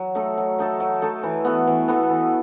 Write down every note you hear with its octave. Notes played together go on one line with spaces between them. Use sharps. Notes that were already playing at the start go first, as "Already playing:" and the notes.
Already playing: F#3
A3 D#4 A4
F#3
A3 D#4 A4
F#3
A3 D#4 A4
E3
B3 F#4 A4
E3
B3 F#4 A4
E3